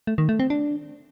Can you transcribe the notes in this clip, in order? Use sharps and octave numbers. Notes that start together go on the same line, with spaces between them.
A3
D#3
A3
C4
D4